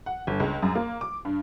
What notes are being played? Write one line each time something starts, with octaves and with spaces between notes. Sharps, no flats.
F#5
G1
C#2
F#2
A#3
D6
G2